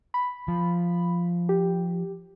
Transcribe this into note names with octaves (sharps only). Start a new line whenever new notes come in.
B5
F3
G4